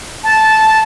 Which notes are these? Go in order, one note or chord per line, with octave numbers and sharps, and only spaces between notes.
A5